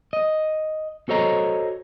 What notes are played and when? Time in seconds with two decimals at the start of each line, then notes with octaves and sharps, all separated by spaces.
0.13 D#5
1.09 F#4 A4 C5 C#5 D#5 A#5